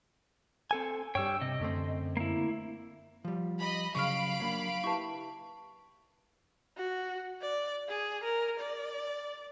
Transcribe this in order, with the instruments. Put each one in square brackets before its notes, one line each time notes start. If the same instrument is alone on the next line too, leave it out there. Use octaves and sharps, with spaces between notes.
[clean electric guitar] C4 A4 G#5
[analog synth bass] G2 [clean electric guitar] G3 C#5 [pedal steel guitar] G5 E6
[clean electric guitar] C3 [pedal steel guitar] D#5
[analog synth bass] F#2 [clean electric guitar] D3 A3 C4
[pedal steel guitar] A#3 E4
[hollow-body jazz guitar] F3 G3
[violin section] D#5 B5
[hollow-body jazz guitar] C#3 F#3 [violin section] F5 B5 D7 [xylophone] C#6 F6
[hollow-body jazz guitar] F#3 A#3 D4
[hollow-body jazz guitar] E4 G4 B4 [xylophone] A5 C#6
[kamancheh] F#4
D5
G#4
A#4
D5